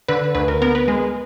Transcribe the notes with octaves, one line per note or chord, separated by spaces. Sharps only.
D3 B4
D2 B4
A#4
B3 A#4
B4
G#3